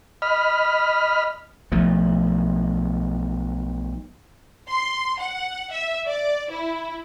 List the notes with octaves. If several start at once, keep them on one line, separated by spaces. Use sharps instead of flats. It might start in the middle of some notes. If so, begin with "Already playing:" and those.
D#5 B5 F6
B1 F3 A3
C6
F#5
E5
D5
E4